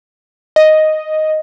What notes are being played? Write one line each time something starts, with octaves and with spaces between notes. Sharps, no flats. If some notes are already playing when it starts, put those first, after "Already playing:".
D#5